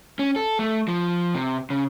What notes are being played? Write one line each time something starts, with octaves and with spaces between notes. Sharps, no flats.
C#4
A4
A3
F3
C3
C#3